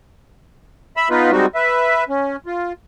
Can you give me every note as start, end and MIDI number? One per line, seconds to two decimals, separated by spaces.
0.97 1.09 76
0.97 1.09 83
0.97 1.09 88
1.10 1.31 59
1.10 1.31 63
1.10 1.31 65
1.10 1.31 71
1.31 1.46 55
1.31 1.46 56
1.31 1.46 60
1.31 1.46 63
1.31 1.46 66
1.55 2.04 71
1.55 2.04 76
2.09 2.36 61
2.46 2.72 65